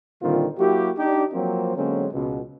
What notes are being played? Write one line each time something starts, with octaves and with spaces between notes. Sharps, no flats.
A#2 D3 D#3 G3 C4 F4
F#3 A#3 E4 F#4 G4
D4 D#4 G4
F3 F#3 A#3 C4
D3 F#3 G#3 A#3 C4 C#4
C#2 B2